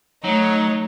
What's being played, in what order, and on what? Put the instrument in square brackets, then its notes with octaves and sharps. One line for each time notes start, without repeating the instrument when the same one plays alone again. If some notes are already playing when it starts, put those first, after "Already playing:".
[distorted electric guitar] F#3 [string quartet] A3 D#4 C#5